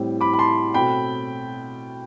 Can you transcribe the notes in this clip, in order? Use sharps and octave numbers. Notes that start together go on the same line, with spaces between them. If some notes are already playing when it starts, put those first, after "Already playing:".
Already playing: A2 G3 C4
B5 D6
B5
A5 C6
B2 A3 C4 G5 B5